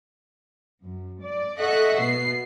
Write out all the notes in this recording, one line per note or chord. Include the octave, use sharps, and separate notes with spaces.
F#2
D5
A4 D#5 E5 F#5 C#6 F#6
B2 B3 C7